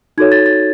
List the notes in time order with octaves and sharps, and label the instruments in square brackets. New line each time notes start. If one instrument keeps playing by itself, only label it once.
[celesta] D#4 F#4 A4 C#5 G#6
A6
A6